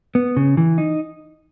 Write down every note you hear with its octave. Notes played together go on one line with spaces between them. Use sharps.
B3
C#3
E3
D#4